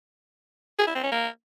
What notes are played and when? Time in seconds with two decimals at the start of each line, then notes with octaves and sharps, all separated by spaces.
0.79 G#4
0.87 E4
0.95 C4
1.03 C#4
1.12 A#3